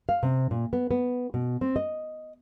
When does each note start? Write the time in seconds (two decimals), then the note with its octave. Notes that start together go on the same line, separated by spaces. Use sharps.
0.09 F5
0.23 C3
0.51 A#2
0.73 B3
0.91 B3
1.34 B2
1.61 C4
1.76 D#5